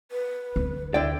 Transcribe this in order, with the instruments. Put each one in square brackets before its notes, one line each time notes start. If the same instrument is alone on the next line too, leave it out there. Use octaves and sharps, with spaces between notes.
[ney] B4
[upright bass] D2
[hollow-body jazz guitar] D3 D5 [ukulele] E4 G5